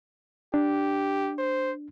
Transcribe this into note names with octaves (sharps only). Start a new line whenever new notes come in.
D4 G4
C5